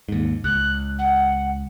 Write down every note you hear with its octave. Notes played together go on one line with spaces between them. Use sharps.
D#2 G#2
C#2 F#6
F#5